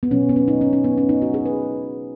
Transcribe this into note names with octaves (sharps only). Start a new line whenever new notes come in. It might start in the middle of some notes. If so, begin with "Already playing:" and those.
B3
B2 F#3 C#4
B3
C#4
D#4
C#4
C#4
B3
C#4
D#4
F#4
G#4
B4